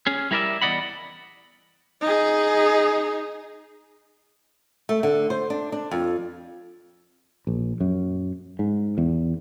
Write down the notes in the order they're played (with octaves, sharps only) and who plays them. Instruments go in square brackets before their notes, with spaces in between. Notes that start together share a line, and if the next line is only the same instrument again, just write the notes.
[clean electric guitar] C#4 G#4
G3 E4 A#4 C5 D5 E5
E2 G3 D5 D#5 F#5 B5
[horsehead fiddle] D#4 G#4
[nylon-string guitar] A3
D3
C5
D4
D4
F2
[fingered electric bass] A#1
F#2
G#2
E2